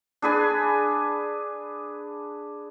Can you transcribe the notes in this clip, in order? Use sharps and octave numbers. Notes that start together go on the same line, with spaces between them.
D4 G#4 B4 G#5